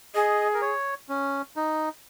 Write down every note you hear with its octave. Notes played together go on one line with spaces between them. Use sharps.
G#4 D#5
A#4
C#5
C#4
D#4